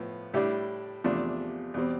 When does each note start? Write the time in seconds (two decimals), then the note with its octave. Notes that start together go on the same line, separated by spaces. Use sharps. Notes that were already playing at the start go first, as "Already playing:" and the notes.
Already playing: A2 F3 B3
0.34 A2 G3 D4 E4 G4
1.04 E2 C3 F3 A3 D4
1.74 E2 B2 G3 C4